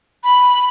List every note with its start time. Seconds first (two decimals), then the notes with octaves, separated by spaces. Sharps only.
0.24 B5